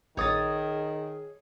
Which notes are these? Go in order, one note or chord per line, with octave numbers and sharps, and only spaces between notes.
A#1 D#3 G#4 C#5 D#6 A6